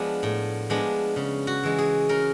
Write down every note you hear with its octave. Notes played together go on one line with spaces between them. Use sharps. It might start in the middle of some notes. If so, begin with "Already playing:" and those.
Already playing: F3 G#3 B3 D4
A2
F3 G#3 B3 D4
C#3
F#4
E3 G#3
G#4
C#3 A#4